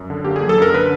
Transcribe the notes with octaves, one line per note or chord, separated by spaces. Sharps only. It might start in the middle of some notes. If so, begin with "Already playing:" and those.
Already playing: F#2
D3
A#3 G4
G#4
F#3
A4
F#2 A#4
D3 B4